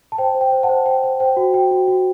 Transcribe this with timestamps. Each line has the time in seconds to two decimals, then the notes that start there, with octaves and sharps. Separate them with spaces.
0.12 A5
0.18 C5 G5
0.35 C5
0.41 G5
0.52 C5
0.63 F#5 A5
0.69 C5
0.86 C5 G5
1.03 C5
1.20 C5 G5
1.37 F#4
1.54 F#4 G5
1.71 F#4
1.88 F#4